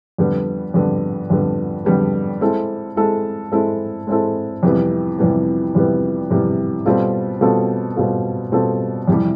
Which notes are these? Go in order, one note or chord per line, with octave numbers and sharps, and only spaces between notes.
F2 D3 G3 B3
F2 D3 G3 B3
F2 D3 G3 B3
F2 D3 G3 B3
G#3 C4 E4 A4
G#3 C4 E4 A4
G#3 C4 E4 A4
G#3 C4 E4 A4
F2 C3 E3 G3 B3
F2 C3 E3 G3 B3
F2 C3 E3 G3 B3
F2 C3 E3 G3 B3
B2 G3 C4 F4 A4
B2 G3 C4 F4 A4
B2 G3 C4 F4 A4
B2 G3 C4 F4 A4
F2 C3 E3 G3